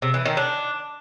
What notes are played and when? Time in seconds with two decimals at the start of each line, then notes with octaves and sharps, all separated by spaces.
0.02 C3
0.14 E3
0.25 D#3
0.37 D4